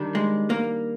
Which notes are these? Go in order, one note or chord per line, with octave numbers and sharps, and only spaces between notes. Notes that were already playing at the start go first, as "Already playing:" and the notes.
Already playing: D#3 G3 D4 G4
G#3
A#3